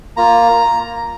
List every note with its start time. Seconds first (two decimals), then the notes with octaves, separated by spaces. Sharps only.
0.17 A#3 F4 A#5